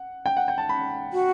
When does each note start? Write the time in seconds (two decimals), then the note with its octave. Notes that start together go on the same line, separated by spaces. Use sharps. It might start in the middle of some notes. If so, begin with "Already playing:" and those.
Already playing: F#5
0.26 G5
0.37 F#5
0.48 G5
0.58 A5
0.69 B5
1.13 F#4